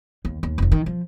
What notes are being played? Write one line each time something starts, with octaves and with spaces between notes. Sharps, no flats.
D#2
D#2
F1 C#2
D#3
F3